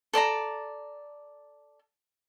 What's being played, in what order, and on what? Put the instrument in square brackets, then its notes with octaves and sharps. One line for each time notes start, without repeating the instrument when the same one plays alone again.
[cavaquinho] A4 D5 A5 A#5